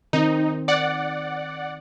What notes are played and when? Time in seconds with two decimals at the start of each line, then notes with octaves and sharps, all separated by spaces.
0.13 D#3 C4 D#4
0.68 D5 F#5